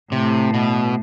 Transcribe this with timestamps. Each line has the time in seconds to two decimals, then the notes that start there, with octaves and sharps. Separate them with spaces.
0.12 A2 C3
0.54 B2